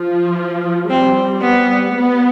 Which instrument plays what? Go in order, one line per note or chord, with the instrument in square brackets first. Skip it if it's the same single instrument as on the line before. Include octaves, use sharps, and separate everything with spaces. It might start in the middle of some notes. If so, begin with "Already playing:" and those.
Already playing: [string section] F3
[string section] G3 [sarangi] C4
[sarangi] B3
[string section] B3